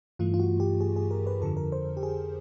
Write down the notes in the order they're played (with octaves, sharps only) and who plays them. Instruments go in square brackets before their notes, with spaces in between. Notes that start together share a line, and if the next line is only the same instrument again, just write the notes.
[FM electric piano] G2 E3 A3 F4
F4
F#4
G4
G#4
G#4
A#4
B4
F2 D3 F3 A4
A#4
C5
G4
G#4